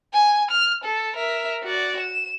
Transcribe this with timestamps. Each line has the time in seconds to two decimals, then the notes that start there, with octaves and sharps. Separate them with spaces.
0.13 G#5
0.51 F6
0.84 A4
1.16 A#4 E5
1.64 F#4 D5
2.00 E7